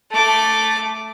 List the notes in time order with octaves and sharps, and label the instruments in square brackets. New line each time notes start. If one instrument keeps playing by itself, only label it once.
[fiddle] A3 D6